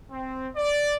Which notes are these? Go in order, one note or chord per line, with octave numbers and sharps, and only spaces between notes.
C4
D5